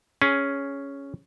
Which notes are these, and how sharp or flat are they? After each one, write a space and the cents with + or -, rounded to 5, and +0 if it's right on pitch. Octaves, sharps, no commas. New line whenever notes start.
C#4 +0 G#4 +0